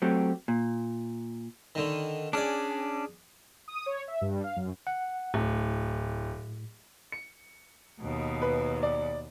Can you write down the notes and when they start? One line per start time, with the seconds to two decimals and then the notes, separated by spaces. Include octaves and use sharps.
0.02 F#3 A3 C4 G4
0.48 A#2
1.75 D3 D#3
2.33 C#4 D4 G#4 D5
3.68 D#6
3.86 C#5
4.08 E5
4.21 G2
4.44 F5
4.57 F#2
4.87 F#5
5.34 D1 A2
7.12 C#7
8.00 D#2 B2
8.42 B4
8.83 D5